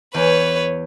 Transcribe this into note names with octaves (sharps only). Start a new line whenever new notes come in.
E2 B4 C#5